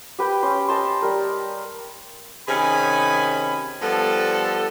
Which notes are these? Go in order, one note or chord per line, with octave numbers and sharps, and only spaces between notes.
G4 B4 G5
C#4 G4 C6
D#5 A5 C6
G3 A#4
C3 D#3 C#4 G#4 G#5 B5
F3 G3 B3 A4